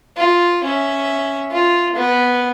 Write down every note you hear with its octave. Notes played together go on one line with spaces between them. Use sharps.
F4
C#4 E5
F4
B3